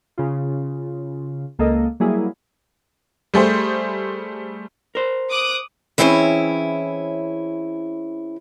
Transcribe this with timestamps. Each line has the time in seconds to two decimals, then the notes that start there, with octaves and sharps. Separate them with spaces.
0.18 C#3 F4
1.59 C#2 A#3 A4 D#5
2.00 F#3 G3 A#3 E4 G#4
3.34 G3 A3 G#4 C5
4.95 A#4 C5
5.28 D6 D#6 F#6
5.98 E3 C4 C#4 E4 G#4 C#5